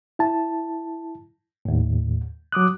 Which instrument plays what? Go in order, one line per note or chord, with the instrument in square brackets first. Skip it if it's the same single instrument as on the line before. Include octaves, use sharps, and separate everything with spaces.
[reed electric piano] E4 A5
D#2 A2
F#3 D6 D#6 F#6